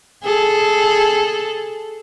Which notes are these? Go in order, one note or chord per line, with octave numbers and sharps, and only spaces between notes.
G#4 A4